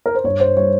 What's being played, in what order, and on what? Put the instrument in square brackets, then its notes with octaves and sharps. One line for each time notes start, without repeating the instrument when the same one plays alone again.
[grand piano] A#4
C5
G2 C#5
C5
G3 C#5